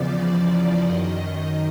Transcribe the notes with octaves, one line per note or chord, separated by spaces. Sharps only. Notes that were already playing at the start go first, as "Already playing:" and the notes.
Already playing: E2 C#3 F3 D5
F#2 D#5
D#3